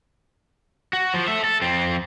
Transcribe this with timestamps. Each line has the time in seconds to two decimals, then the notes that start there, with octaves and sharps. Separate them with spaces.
0.93 F#4
1.14 F3
1.28 A4 E5
1.44 A4
1.62 F2 C4